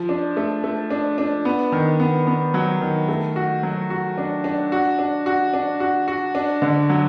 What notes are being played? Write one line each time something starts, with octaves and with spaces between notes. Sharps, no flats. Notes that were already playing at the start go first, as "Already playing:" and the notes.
Already playing: F3
D4
A3
A3
D4
D4
B3
D#3
B3
B3
F#3
D#3
A3
F#4
F#3
F#4
D4
D4
F#4
D4
F#4
D4
F#4
F#4
D4
D3
F#3